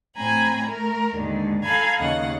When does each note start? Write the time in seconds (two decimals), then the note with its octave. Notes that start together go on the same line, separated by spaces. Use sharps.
0.16 A2 C4 G#5 A#5 B5
0.64 A3 A#4
1.14 D#2 G#2 D3 G#3
1.63 A4 F5 G#5 A#5 B5 G#6
1.99 D#2 C#3 D#5 F5 F#5